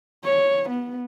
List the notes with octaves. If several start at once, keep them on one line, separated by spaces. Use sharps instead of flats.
C#5
B3